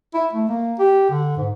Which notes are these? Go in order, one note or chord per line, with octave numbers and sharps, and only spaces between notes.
E4
A3
A#3
G4
D3
G#2